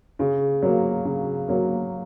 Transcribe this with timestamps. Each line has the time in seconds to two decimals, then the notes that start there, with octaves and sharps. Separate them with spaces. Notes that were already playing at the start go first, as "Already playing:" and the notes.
0.19 C#3
0.62 F#3 A#3
1.05 C#3
1.48 F#3 A#3